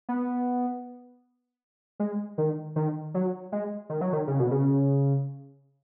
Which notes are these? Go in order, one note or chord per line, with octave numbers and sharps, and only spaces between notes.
B3
G#3
D#3
D#3
F#3
G#3
D#3
F#3
D#3
C#3
B2
C#3